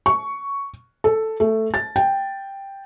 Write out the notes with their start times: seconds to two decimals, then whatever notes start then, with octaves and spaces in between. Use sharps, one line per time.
0.06 C#6
1.04 A4
1.40 A3
1.74 A6
1.96 G5